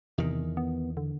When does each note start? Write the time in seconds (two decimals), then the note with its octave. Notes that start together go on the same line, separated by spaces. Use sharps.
0.18 E2 C3 D#3
0.57 B3
0.97 D3